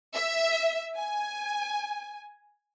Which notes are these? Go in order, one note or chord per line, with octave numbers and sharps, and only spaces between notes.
E5
G#5